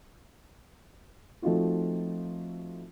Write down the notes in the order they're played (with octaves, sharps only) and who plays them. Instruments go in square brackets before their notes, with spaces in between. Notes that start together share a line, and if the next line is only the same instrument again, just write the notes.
[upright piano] F3 A3 C4 D#4 F4 F#4